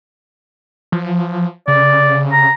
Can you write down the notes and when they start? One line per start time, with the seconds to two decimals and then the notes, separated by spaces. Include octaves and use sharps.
0.92 F3
1.68 C#3 D5
2.32 A#5